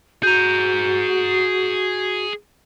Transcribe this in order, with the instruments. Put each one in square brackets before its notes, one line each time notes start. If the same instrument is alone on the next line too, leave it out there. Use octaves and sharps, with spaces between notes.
[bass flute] F#4 [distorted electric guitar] G#4 A#5 [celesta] G6 D#7